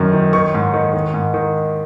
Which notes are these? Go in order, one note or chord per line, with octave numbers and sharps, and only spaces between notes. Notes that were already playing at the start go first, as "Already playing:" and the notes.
Already playing: F#2 D#3
D#3
D#3 C#6
G#2
D#3
D#3
G#2
D#3